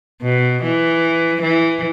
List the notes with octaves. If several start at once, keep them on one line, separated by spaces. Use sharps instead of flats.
B2
E3
E3